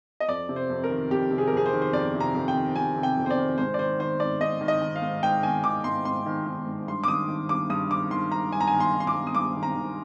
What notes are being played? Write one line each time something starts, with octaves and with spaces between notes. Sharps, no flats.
D#5
F2 D5
C3
C5
F2
A#4
D#3
F2 G4
C3
G#4
A#4
F2 G#4
C5
D#3
C5
F2 D5
C3
A#5
F2
G5
D#3
F2 G#5
C3
G5
F2
C5
D5
D#3
G#2 C5
D5
D#3 C5
D#3 C5
G#2 D5
G#2 D#5
D#3
D#5
D#3
F5
G#2
G#2 G5
D#3 G#5
D#3 D6
G#2 C6
G#2 C6
D#3
D#3
G#2
G2 C6
D6
D#3 D#6
D#3
G2 D6
G2 D#6
D#3 D6
D#3 C6
G2 A#5
G2 G#5
A#5
G#5
D#3
C6
D#3
C6
D6
G2
D#6
G2 D6
D#3
A#5
D#3